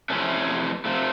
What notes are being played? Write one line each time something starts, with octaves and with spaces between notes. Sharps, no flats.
F2 C3 E3 A3 C#4
C3 F3 A3